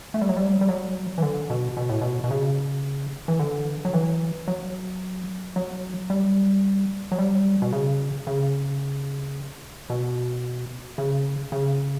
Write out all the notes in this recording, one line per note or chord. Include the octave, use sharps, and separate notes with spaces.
A3
G3
F#3
G3
G3
F#3
E3
D3
B2
B2
A2
B2
B2
C#3
E3
D3
F#3
E3
F#3
F#3
G3
F#3
G3
B2
C#3
C#3
B2
C#3
C#3